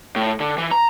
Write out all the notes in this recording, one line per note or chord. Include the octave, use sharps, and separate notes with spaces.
A2
D3
E3
A#5